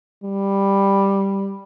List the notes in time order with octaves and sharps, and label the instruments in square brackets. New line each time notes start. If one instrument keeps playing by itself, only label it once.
[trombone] G3